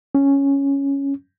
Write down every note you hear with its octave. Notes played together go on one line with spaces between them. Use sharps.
C#4